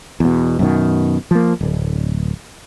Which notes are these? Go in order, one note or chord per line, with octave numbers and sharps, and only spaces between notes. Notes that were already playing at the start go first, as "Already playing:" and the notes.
E2 B2
F#2 B2 D#3
F3 A#3
D1